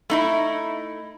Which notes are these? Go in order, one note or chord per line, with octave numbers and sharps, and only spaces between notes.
A3 D#4 E4